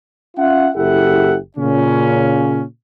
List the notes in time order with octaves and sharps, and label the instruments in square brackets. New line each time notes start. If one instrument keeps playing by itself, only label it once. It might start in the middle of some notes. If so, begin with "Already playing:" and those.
[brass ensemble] C#4 F4 E5 F#5
F#1 E4 G4 A4 E5 F#5
A#2 C#3 C#4